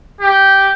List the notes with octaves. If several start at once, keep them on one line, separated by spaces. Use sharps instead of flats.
G4